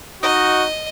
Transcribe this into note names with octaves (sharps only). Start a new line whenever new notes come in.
D#4 F#4 D#5